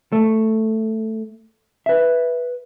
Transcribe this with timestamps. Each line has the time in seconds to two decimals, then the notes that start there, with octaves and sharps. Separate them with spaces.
0.12 A3
1.86 B4 E5